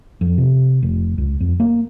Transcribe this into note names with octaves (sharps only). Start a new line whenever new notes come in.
F2
C3
F1
C#2
F2
A#3